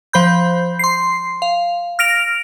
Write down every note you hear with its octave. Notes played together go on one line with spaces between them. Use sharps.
F3 C5 B5 G6
C6 C7
F5
F6 A#6 D7 F7